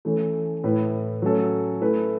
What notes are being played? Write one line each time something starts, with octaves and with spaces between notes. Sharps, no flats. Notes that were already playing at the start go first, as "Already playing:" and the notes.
E3 A3 C#4 A4
A2 A3 E4 B4
F#3 A3 C#4 A4
A3 E4 B4